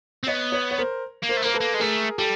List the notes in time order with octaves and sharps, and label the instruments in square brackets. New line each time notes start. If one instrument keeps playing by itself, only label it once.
[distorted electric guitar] C4
[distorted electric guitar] B3 [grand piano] C#5 D#5
[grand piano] B4 C#5
C#5
A#4 C5
[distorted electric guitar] A#3
[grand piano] A#4 C5
[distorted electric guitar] A3
[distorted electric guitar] A#3 [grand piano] A#4
[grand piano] A4 B4
[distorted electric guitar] A#3
G#3
[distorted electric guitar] A3 [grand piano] G#4 A#4
[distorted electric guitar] G3 [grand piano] G4 A4